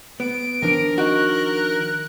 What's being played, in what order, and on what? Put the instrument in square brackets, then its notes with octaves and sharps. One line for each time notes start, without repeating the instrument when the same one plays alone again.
[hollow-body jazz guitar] B3 [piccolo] D7
[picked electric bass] D#3 F3 D4 [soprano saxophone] A#4
[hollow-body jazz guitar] D#4 F#4 [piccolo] F#6